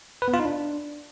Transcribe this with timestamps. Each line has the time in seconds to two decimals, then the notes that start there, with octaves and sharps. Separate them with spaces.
0.22 B4
0.28 B3
0.34 F4
0.39 D#4
0.45 D4